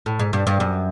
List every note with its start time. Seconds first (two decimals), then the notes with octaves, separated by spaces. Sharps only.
0.06 A2
0.19 G#2
0.33 G2
0.47 G2
0.60 F#2